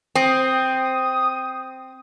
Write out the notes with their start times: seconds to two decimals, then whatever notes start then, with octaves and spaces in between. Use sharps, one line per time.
0.15 C4 D#6